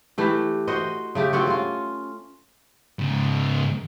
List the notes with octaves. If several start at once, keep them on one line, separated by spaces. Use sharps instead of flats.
E3 A3 G4
F#4 C5 D#5
C#3 A3 G4
C4 F4 F#4 C#5
C#4 F4
G#2 C#3